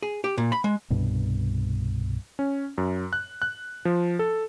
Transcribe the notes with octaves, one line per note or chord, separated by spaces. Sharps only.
G#4
G4
A#2
B5
G#3
C2 G2 B2
C#4
F#2
F#6
F#6
F3
A4